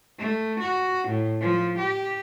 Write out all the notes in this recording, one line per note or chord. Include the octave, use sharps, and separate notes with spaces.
A3
F#4
A2
F3
G4